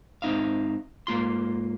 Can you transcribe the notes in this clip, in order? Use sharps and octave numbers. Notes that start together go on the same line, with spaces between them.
G#2 C4 D#4 E5 F5
G#2 A#3 F4 C6